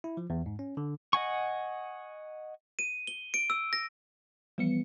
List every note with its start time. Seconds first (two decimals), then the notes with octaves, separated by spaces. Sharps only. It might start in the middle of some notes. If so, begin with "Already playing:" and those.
0.04 E4
0.17 F3
0.30 E2
0.46 G#2
0.59 C#4
0.77 D3
1.13 D#5 F#5 G#5 C#6
2.79 D#7
3.07 G7
3.34 D7
3.50 E6
3.73 A#6
4.58 E3 F3 G3 B3 C#7